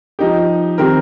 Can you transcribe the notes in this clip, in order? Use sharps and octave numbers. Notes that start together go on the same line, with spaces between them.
F3 D#4 G4
D#3 C4 G4 A#4